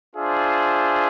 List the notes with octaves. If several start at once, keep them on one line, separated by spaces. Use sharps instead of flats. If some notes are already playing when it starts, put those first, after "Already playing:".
D4 F4 G#4 C5 E5